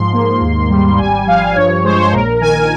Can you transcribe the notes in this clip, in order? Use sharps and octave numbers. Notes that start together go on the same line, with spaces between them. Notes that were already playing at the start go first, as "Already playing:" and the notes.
Already playing: G#2 F3 C6
A#3
D#2
G3
G#1 G#5
F3 F5
G2 C#5
G#3 C5
C#5
C5
A#1 A#4
D#3 G#5